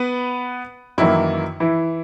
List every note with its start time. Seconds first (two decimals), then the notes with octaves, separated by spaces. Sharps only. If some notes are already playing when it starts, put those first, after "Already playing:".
Already playing: B3 B4
0.98 F#2 D#3 E3 F#3 A#3 E4
1.60 E3 E4